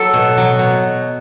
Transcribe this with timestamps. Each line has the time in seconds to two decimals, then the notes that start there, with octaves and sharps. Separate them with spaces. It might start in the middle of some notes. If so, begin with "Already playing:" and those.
Already playing: F#3 A4
0.13 B2
0.37 F#3
0.59 B2